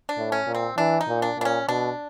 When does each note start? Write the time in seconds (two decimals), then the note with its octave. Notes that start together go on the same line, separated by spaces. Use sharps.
0.09 D4
0.18 A2
0.32 C#4
0.47 A#2
0.55 C4
0.77 E3 D4
1.01 D#4
1.08 A#2
1.22 D4
1.39 A#2 D4
1.45 C#4
1.69 B2 D4